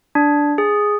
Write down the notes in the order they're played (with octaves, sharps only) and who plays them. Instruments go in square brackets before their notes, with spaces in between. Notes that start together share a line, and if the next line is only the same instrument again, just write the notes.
[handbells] D4
G#4